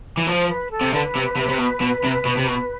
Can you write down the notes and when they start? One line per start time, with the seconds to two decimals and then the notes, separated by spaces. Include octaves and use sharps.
0.17 E3
0.27 F3 C5
0.49 B4
0.71 A4
0.81 C3
0.94 D3 B4
1.16 C3
1.37 C3
1.49 C3
1.59 B2
1.81 B2
2.04 C3
2.25 B2
2.37 C3
2.47 B2